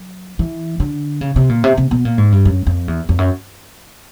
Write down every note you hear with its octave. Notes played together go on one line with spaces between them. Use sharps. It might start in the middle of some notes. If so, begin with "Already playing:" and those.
Already playing: F#3
E3
D3
C#3
C3
A#2
C3
C3
B2
A#2
G#2
G2
F#2
F2
E2
F2
F#2